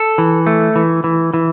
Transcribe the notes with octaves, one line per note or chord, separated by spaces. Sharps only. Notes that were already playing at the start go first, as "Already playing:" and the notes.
Already playing: A4
E3
A3
E3
E3
E3